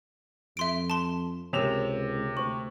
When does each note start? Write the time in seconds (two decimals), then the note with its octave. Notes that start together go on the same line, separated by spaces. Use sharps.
0.57 F2 E5 C6 D7
0.90 A5 C6
1.53 C#2 C3 A#4 C#5 E7 F7
2.37 D2 C5 C#6